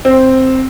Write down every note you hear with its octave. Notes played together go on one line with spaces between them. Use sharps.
C4